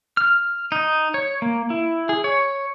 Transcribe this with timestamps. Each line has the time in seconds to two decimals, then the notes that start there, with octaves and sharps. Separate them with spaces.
0.17 F6
0.72 D#4
1.14 C#5
1.42 A#3
1.70 E4
2.09 G#4
2.24 C#5